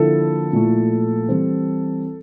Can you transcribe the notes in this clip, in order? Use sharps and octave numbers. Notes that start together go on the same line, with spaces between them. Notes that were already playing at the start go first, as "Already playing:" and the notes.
Already playing: D3 F3 A#3 E4 A4
A#2 F3 A3 E4
E3 G3 C4